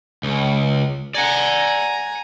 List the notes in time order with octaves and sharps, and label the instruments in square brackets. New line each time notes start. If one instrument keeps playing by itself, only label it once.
[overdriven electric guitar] C#2
[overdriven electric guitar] D5 F#5 [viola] G#5 A#5